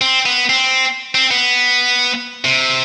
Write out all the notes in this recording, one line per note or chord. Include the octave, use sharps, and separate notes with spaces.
C4
B3
C4
C4
B3
C3